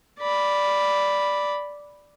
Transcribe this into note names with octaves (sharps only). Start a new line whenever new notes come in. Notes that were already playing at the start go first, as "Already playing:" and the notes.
D5 B5